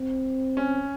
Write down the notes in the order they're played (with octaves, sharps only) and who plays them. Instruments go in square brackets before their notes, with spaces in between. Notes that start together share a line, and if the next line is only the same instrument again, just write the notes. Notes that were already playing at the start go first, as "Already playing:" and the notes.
Already playing: [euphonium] C4
[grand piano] C#4